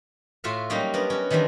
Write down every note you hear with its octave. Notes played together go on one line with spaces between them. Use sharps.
A2 F4 F#4 E5 F5
F#3 G3 A#3 C#4 D#4
B3 D4 A#4
C#4 F#4
D#3 E3 G3 C4 D4